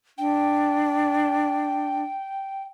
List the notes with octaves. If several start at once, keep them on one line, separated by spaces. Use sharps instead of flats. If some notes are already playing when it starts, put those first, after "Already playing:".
D4 G5